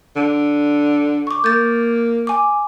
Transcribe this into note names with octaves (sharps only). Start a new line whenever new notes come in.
D3
C#6 D6
A#3 G6 A6
G#5 D6